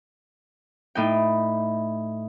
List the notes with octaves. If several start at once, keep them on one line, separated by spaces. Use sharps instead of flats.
A2 D#4 G5